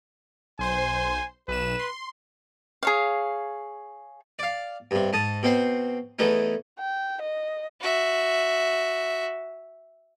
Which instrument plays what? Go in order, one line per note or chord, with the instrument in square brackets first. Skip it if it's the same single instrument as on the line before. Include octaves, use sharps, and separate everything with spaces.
[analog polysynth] B1 C5 C6 [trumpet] G#5
[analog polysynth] B1 E7 [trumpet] B4
[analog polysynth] C6
[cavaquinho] G#4 C#5 F5
[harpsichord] D5 F5
G2 C3
G#2 A5 D#6
B2 C4 C5
E2 E3 A3 D#4
[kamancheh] G5
D#5
[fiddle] F#4 E5